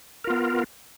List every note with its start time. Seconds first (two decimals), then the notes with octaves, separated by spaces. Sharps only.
0.24 A#4
0.27 F4
0.30 B3